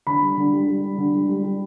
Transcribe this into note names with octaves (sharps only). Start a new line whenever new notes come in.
D3 B5
G3
D3
G3
G3
G3
D3
G3
G3
G3